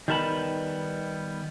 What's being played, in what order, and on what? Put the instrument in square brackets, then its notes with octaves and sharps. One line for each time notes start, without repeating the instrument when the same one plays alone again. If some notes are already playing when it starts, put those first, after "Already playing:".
[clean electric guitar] D#3 G3 B3 A#4 A5 B5